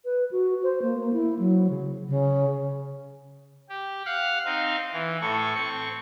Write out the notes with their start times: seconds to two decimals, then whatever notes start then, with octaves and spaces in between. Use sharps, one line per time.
0.05 B4
0.31 F#4
0.63 C5
0.82 A#3
0.99 A#3
1.13 E4
1.39 F#3
1.70 C#3
2.08 C#3
3.69 G4
4.06 F5 F#5 F6 F#6
4.45 C4 D#4 F5
4.93 E3
5.21 A2 A4 C#6
5.55 C4 C#6